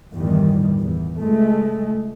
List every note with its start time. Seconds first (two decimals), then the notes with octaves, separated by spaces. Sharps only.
0.14 G1 E2 A2 D#3 G3
0.80 E2
1.19 C#2 G#3 A3